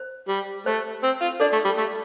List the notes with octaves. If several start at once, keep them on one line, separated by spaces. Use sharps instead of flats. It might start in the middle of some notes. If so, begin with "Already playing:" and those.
Already playing: C5
G3
A3 C5
C4
F4
D4 A4 D5
A3
G3
A3